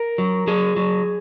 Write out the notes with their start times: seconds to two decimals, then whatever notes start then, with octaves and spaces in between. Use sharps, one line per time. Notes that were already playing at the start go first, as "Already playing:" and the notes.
Already playing: A#4
0.18 F#3
0.47 F#3 G#4
0.76 F#3